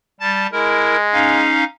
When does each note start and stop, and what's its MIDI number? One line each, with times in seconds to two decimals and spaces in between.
0.20 0.47 55
0.20 0.47 81
0.20 0.47 93
0.52 1.58 56
0.52 0.96 64
0.52 0.96 70
1.13 1.64 61
1.13 1.64 63
1.13 1.64 77